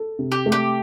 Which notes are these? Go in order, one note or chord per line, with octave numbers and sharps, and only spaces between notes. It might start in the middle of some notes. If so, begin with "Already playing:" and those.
Already playing: A4
C3
G4
A3
G4